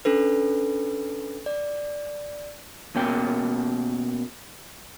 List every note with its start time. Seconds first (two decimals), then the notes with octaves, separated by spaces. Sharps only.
0.05 C#4 D4 A4 B4
1.46 D5
2.96 B2 A#3 C#4 G5